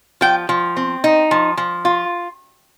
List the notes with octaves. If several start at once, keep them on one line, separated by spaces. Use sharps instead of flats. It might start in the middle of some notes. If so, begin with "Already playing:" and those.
F3 G5
F3
C4
D#4
F3
F3
F4